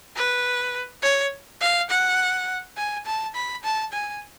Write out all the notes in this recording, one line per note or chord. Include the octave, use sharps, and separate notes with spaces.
B4
C#5
F5
F#5
G#5
A5
B5
A5
G#5